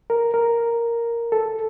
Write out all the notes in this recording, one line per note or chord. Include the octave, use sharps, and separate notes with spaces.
A#4
A#4
A4